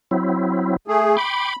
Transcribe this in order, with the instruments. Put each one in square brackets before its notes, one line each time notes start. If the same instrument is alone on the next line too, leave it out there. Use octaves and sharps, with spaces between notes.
[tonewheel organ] F#3 C4 E4
[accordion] A3 G#4
[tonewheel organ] G5 C6 D6 [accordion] B5